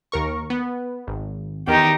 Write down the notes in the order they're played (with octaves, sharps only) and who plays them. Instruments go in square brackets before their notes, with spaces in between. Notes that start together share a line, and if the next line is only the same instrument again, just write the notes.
[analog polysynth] D#2 A#4 C#6
B3
G#1
[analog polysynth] E2 D#3 [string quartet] D#4 G4